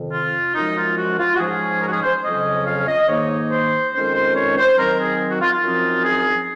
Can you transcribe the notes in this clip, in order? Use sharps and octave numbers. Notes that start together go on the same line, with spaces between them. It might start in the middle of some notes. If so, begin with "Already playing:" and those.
Already playing: F2 C3 D#3
F4
F#2 F3 G#3 D#4
F4
F#4
F4
F#4
G#2 F3 G#3 C#4 G#4
A#4
F#4
G#4
C5
F2 C#3 F#3 C#4 D#5
F5
D#5
G#2 D#3 A#3 D#4 C#5
C5
F2 D#3 G#3 C#4 C5
C5
C#5
C5
D#3 F#3 C4 A#4
G#4
F#4
F4
F4
F#2 F3 C4 D#4
G#4